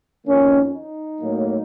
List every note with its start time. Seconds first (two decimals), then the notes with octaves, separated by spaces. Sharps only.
0.25 F2 D#3 A#3 C#4
0.73 D#4
1.21 A2 F#3 A#3